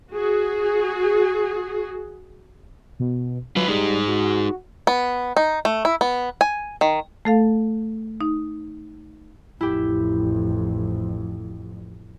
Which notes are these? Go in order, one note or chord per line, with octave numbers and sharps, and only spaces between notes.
F#4 G#4
B2
F#3 F4 B4
G3 D#4 G#4
F#4
B3
D#4
A3
E4
B3
G#5
D#3
A3 A4 F5
D#4
A1 F2 E4 G4